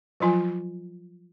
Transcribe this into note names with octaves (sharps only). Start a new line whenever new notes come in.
F3 F#3 F4 G#5